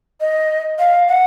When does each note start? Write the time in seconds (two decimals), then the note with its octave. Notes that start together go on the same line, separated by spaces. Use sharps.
0.21 D#5
0.79 F5
1.08 F#5